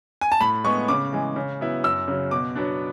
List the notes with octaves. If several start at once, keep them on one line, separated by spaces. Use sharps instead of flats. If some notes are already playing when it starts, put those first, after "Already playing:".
G#5
A5
A2 B5
G#3 B3 C#6
C#3 D6
E3 G#3
C#3
F#3 B3 E4
F#2 E6
C#3 F#3
B2 D6
F#3 B3 D4